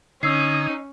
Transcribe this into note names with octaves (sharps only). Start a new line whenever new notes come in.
D3 C#4 D#4 D#6 E6 G#6 C7